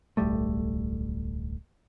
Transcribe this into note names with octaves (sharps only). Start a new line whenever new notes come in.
D1 B1 G3 A3